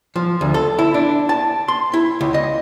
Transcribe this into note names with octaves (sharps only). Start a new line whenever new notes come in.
F3
D2
A4
E4
D4
A5
C6
E4
C#2
D#5